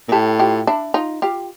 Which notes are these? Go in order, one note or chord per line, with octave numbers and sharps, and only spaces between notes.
A#2
A2 G4 A4
F4 G4
D4 E4
D#4 F4
F4 G4